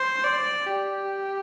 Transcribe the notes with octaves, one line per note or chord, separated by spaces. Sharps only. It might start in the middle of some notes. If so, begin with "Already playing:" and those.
Already playing: C5
D5
G4